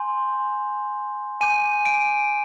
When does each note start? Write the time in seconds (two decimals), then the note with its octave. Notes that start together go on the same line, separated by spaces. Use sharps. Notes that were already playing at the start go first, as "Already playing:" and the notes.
Already playing: G#5 C6 G6
1.41 G#5 D6 G6 D#7
1.85 D7